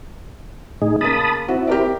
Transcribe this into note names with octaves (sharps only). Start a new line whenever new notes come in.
A2 D#4 G#4
C#3 A#3 A5 B5 D#6
C4 E4 F#4
G4 A#4 D5